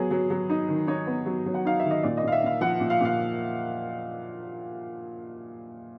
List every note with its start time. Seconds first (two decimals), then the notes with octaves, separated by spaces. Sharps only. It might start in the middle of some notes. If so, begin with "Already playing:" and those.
Already playing: F#3 B3 G#4
0.11 F#3
0.30 F#3
0.50 D#4
0.69 D#3
0.87 D#4 C#5
1.07 B3
1.26 F#3
1.46 F#3
1.54 F#5
1.65 D#4 F5
1.79 D#3 E5
1.91 D#5
2.03 A#2 D5
2.17 D#5
2.23 A#2 F5
2.32 E5
2.43 A#2 F5
2.61 F3 F#5
2.80 A#2
2.90 F5
3.00 A#2 F5